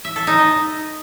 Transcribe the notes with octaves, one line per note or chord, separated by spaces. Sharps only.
E5
A4
D#4
D#5